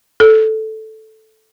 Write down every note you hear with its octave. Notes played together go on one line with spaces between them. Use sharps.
A4